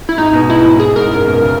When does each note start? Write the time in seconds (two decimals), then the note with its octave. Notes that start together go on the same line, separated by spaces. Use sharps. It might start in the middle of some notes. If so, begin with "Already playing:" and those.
0.09 E4
0.18 G#2 D#4
0.33 B2
0.49 G#2 E4
0.64 G#2
0.80 G#4
0.96 G#2 A#4
1.11 F#2 A#4
1.26 B2
1.42 C#3